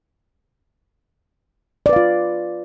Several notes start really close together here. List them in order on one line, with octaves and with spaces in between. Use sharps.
D5 B4 F5 F4